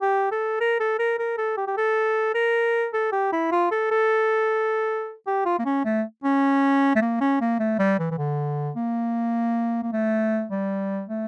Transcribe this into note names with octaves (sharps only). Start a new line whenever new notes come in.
G4
A4
A#4
A4
A#4
A#4
A4
G4
G4
A4
A#4
A4
G4
E4
F4
A4
A4
G4
F4
A#3
C#4
A3
C#4
A3
A#3
C#4
A#3
A3
G3
E3
E3
D3
A#3
A#3
A3
G3
A3